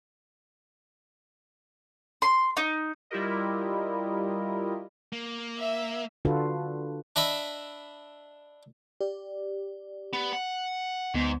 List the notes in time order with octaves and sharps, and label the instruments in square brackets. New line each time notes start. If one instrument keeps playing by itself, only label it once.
[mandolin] C6
D#4
[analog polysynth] G3 E4 F4 G4 A#4 D#5
[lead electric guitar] A#3
[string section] E5
[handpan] D3 D4 F4 F#4 A4 B4
[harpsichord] D4 D#5 E5 B5
[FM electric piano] G4 D5
[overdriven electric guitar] B3
F#5
[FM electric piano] D2 B3 [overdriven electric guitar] G#2